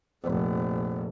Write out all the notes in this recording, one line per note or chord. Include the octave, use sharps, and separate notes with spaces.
F1 A#1